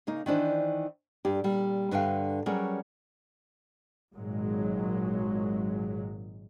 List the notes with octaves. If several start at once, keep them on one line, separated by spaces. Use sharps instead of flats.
C#3 A#3 D#4
D#3 E3 D4 C5
G2 G4
A#2 G3
G2 D3 B4 E5 F5 G5
F#3 G3 C#4 G#4 A#4 B4
G#1 A#2 F#3 G#3